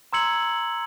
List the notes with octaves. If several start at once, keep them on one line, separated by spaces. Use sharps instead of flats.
A#5 C6 E6 G#6 C#7 F#7